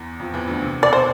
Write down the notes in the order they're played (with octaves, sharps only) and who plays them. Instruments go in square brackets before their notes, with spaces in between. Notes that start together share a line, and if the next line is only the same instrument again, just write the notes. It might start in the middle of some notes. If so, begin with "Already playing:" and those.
Already playing: [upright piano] E2 E3
F2 F3
E2 E3
D2 D3
C3
[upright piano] B2 [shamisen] D5
[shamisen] C5